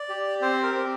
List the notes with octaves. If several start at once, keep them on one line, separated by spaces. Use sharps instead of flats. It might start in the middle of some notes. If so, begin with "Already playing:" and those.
Already playing: D5
G4
C4 C5
A#4
C4